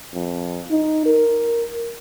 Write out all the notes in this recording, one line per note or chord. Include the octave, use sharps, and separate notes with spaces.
F2
D#4
A#4